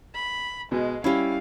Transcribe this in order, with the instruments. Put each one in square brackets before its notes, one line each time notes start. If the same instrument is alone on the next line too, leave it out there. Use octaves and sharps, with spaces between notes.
[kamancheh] B5
[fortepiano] B2 [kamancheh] G#3
[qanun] G3 E4 [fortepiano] C#4 [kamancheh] F5